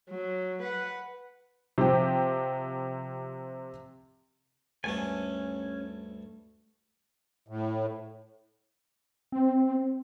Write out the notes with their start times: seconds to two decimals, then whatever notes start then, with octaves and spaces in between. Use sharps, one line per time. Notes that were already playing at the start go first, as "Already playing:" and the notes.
0.10 F#3
0.62 B4 F#5
1.78 C3 F3 G4
4.84 D2 G2 A3 C#4 G#5
7.48 A2
9.32 C4